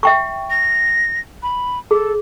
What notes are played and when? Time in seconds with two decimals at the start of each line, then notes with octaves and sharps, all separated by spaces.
0.03 E5 G5 C#6
0.50 A#6
1.42 B5
1.91 G#4 A4